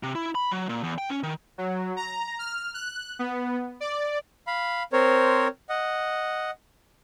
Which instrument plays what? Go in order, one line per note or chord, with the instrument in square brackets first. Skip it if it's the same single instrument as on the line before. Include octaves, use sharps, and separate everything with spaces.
[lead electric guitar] C3
E4
B5
F#3
A#2
E2
G5
C#4
D#3
[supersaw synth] F#3
A#5
F6
F#6
B3
D5
[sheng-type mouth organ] F5 B5
C4 A#4 C5 C#5
D#5 F#5